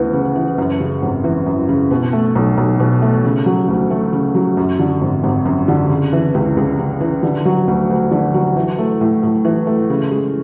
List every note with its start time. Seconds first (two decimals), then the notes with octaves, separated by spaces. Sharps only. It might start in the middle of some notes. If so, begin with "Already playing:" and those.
Already playing: D2 C#3 E3 B3
0.13 C#3
0.35 E3
0.58 F#2
0.80 C#3
1.02 G#1
1.24 E3
1.46 F#2
1.69 C#3
1.91 B2
2.13 A3
2.35 B1
2.57 B1
2.80 B2
3.02 A3
3.24 C#3
3.46 F#3
3.68 D2
3.91 A3
4.13 C#3
4.35 F#3
4.57 F#2
4.79 D3
5.01 G#1
5.23 G#1
5.45 F#2
5.68 D3
5.90 C#3
6.13 E3
6.34 C#2
6.57 C#2
6.79 C#3
7.01 E3
7.23 D3
7.45 F#3
7.68 D2
7.90 D2
8.11 D3
8.34 F#3
8.56 E3
8.78 A3
9.01 A2
9.23 A2
9.45 E3
9.67 A3
9.90 C#3
10.11 G#3